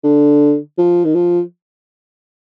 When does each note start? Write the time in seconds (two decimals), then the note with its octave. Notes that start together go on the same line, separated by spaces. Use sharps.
0.04 D3
0.78 F3
1.05 D#3
1.14 F3